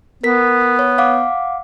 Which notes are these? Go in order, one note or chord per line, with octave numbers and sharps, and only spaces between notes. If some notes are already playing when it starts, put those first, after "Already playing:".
B3 A#4 B6
C#5
F5 F#5 D6